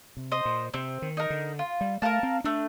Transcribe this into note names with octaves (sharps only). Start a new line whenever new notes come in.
C3
C5 D#5
A#2
C3 C4
D#3
D#4 A#4
D3
F4
G3
A3 A#4 F5 A5
C4
A3 D4